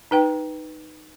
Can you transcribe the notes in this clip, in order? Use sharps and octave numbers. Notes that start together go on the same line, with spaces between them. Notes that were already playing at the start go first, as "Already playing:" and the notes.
D#4 B4 G5